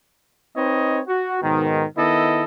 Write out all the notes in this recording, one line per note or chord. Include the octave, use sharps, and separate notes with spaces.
C4 D#4 B4 C#5 D#5
F#4
G#2 B2 D#3
D#3 B3 E4 A4 D#5